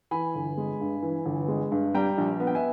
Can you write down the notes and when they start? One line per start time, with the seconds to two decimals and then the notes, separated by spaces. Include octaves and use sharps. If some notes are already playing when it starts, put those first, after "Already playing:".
0.11 E3 G#5 B5
0.35 G1
0.57 G#3
0.81 G2
1.02 E3
1.25 G1
1.48 G#3
1.71 G2
1.94 G3 G5 A#5
2.18 A#1
2.40 B3
2.47 G5
2.55 E5 G#5